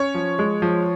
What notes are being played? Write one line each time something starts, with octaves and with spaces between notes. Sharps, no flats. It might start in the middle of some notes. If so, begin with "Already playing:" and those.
Already playing: C#4 C#5
F3
G#3
F3